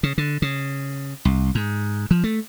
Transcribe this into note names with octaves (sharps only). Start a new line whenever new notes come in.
C#3
D3
C#3
C2
G#2
F3
A3